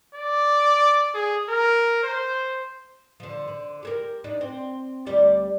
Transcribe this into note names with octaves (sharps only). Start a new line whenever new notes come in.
D5
G#4
A#4
C5
D3 F3
D3
G4 G#4 A#4
D4 D#4
C4
D2 G3 D5